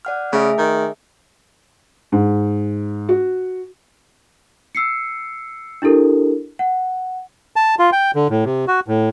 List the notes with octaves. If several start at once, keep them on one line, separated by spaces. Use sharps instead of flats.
D5 F#5 F6
C#3 A3 G#4 E5
D#3
G#2
F#4
E6 C7 C#7
D4 E4 G4 A4 A#4
F#5
A5
F4
G5
D3
A2
C3
F#4
A2